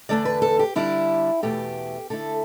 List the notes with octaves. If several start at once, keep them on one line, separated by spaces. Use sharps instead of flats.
E2 D3 A3 D4 D5
B4
A4
G4
D3 G3 D4 E4
E2 B2 A3 G4
D3 A3 E4 A4